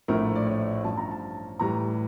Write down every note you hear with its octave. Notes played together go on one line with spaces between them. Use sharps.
A#1 A2 F3 A3 E4 A#4
D5
C#5
A1 G2 F3 A5
A#5
A5
A2 E3 G3 A#5